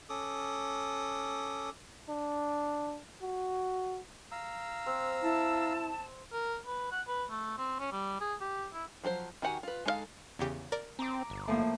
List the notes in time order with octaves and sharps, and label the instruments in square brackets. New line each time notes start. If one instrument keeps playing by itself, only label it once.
[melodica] C#4 A4 D6 D#6
[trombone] D4
F#4
[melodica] F5 A#5 E6
[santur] C4
[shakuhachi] E4 [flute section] A5
[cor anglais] A#4
B4
F#5
B4
A3
C4
C#4
G3
G#4
G4
E4
[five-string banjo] F3 F#3 A4 C5
D#3 F#4 G4 F#5 G#5
F4 B4
G#3 D#4 G#4 A4 F5
[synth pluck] E2 C#3 G4
A#4 D5
[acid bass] C4 [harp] A#5 D6
[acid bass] G1
[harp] A2 F3 A#3